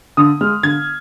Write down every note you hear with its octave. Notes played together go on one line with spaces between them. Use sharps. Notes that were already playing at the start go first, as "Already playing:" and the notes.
D3 D#6
G#3 F6
D3 G#6